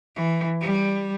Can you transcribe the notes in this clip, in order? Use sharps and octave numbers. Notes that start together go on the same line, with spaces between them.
E3
G3